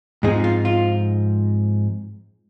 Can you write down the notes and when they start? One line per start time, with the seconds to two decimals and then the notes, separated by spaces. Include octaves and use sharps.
0.23 G#2 F3 C4 D#4 G#4
0.44 F4
0.65 F4